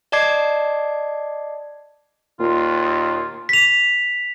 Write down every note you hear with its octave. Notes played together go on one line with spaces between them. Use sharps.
D5 D#5 A5 D6 G#6 C7
D#2 A#2 F4
B6 F7